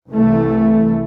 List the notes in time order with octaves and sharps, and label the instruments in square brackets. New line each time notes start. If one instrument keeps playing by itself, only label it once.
[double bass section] C2 E3 A3